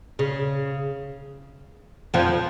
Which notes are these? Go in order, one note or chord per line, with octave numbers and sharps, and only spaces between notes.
C#3
F2 F3